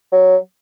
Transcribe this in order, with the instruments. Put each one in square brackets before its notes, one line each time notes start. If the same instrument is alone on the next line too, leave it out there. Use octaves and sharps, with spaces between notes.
[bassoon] F#3